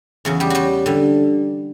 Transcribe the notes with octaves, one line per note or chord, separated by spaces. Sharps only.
E2 C#3 F#3
G3 G4
G3 F#4 G4
D3 G3